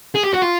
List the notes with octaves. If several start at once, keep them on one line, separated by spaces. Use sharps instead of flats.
G#4
G4
F#4
F4